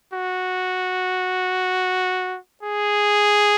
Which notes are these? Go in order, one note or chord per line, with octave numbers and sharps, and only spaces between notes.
F#4
G#4